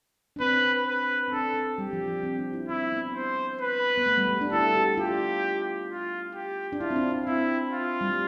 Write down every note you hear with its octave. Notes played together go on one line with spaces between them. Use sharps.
D4
C4 B4
B4
C4
D4 A4
C4
G3 G4
F3
F3
C4
D4
E4
C4 E4
B3
C5
B4
B3
A3
G3
G3
D4
E4 A4
G4
F4 G4
F4
G4
D4
E4 F4
C4
D4
D4
C4 E4
F4
G3
A3